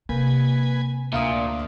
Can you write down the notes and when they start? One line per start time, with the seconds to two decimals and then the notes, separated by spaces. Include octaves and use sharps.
0.09 C3 A#3 B4 G#5
1.13 D2 A#2 E5 F5 D#6